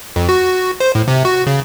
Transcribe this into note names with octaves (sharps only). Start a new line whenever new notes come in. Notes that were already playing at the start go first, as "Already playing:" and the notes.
F2
F#4
C5
A2
C3
F#4
C#3